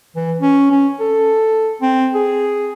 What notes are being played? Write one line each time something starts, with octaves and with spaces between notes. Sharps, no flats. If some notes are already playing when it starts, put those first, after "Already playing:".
E3
C#4
C#4
A4
C4
G#4